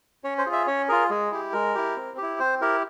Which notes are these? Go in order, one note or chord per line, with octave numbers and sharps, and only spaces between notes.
C#4 C#5
C5
F4 G#4
E5
C#4 C#5
F4 G#4 A#4
G#3 G#4
E4 G4
G#3 A#4
E4 G4
C4
E4 G4
C4 C5
E4 G4 A#4